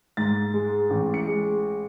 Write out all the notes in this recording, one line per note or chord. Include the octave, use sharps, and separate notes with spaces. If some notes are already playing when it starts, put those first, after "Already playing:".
G#2 A6
G#3
A1
C#7
G#3